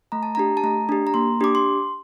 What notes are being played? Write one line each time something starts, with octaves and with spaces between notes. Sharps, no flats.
A3 A#5
A5
D4 G4 A#5
A5
A3 A#5
D4 G4
A#5
A#3 C6
D4 G4 D6
C6